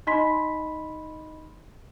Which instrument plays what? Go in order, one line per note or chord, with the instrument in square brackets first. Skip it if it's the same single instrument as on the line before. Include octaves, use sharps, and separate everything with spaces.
[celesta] D#4 D#5 B5 C6 B6